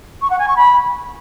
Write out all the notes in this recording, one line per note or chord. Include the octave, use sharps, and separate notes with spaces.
C#6
F#5
G#5
C#6
B5